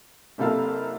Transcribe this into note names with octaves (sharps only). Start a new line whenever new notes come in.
F#1 C3 A4 F5